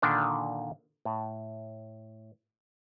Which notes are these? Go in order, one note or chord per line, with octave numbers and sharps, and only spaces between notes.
A#2 D3 D#3 D4
A2